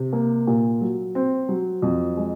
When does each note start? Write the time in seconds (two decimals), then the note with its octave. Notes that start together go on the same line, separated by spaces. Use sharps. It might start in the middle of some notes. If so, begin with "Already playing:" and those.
Already playing: C3
0.13 A#3
0.47 A#2
0.81 F#3
1.15 C4
1.49 F#3
1.82 F2
2.17 G#3